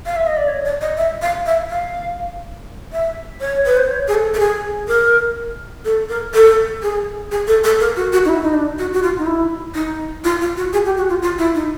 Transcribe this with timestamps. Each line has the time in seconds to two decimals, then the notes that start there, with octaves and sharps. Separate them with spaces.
0.06 F5
0.16 E5
0.27 D#5
0.37 D5
0.48 C#5
0.65 D5
0.81 D#5
0.97 E5
1.22 F5
1.46 E5
1.70 F5
2.92 E5
3.40 C#5
3.66 B4
3.77 C5
3.90 C#5
4.08 G#4
4.15 A4
4.34 A4
4.39 G#4
4.88 A#4
5.85 A4
6.09 A#4
6.34 A4
6.83 G#4
7.31 G#4
7.47 A4
7.64 A4
7.80 A#4
7.96 F#4
8.13 F#4
8.25 D#4
8.29 E4
8.43 D#4
8.54 D4
8.79 F#4
8.93 F#4
9.02 F4
9.18 D#4
9.26 E4
9.75 D#4
10.24 F4
10.41 F4
10.57 F#4
10.73 G#4
10.86 G4
10.97 F#4
11.10 F4
11.22 F4
11.38 E4
11.55 D#4